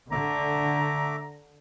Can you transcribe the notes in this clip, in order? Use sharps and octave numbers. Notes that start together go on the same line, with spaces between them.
D3 A3 E5 A#5 D6